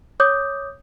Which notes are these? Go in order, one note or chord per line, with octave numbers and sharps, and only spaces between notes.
C#5 D6 D#6 G6